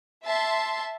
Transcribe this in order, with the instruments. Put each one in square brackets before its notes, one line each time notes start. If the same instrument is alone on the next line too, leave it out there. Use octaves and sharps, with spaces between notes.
[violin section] E5 A5 C6